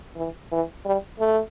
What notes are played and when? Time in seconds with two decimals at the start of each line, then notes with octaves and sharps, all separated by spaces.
0.17 E3
0.52 E3
0.86 G3
1.20 A3